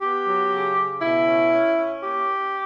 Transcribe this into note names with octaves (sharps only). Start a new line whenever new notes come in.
B3 G4
F#3
C#3
C#3
B2 E4
C#4
C#4
C#4
A#3 G4